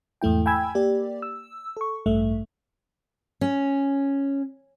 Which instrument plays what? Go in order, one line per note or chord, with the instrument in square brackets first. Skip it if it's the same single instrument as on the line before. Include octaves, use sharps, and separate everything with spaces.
[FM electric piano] E2 G#2 A3 E4 G5
G5 G#5 B5 E6 G#6
A#3 G4 D5
E6
A4 C#6
A1 G2 A3 E5
[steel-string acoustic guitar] C#4